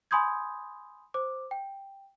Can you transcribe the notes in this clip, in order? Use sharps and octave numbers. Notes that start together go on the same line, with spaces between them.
G#5 B5 C6 D#6 G6 G#6
C5 D6
G5